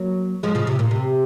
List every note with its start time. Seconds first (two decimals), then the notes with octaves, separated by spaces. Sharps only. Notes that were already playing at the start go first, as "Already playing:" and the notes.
Already playing: F#3 A#3
0.43 F3 G#3
0.55 C#3 F3
0.67 C3
0.79 A#2
0.91 C3